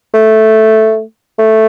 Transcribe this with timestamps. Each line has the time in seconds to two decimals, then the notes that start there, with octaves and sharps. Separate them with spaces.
0.14 A3
1.39 A3